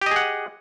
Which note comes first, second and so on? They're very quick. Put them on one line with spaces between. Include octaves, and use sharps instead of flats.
G4 D#5 G#4 F#5